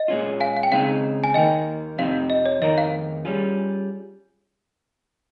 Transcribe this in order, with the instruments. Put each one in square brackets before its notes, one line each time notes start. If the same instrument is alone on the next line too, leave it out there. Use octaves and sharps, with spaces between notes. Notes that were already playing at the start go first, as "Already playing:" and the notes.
Already playing: [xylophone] D#5
[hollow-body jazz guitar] A#2 G#3 C#4 F4
[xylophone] F5 G#5
F5
G5
[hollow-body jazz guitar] C#3 G#3 C4 D#4 [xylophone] F5
[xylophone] G#5
[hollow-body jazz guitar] D#2 D#3 A#3 [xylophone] D#5 G5
[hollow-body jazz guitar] F2 C3 F3 C4 D#4 [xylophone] F5
[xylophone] D#5
C#5
[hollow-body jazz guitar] F2 D#3 A#3 D#4 A#4 [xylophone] D#5
[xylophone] F5
[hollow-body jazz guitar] G3 C#4 F4 G#4